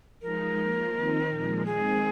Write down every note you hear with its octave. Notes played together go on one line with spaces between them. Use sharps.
F3 G#3 D#4 A#4
F3 A#3 F4
D#3 C4 D#4
A#2 F3 G#3
D#3 G#3 C4 G#4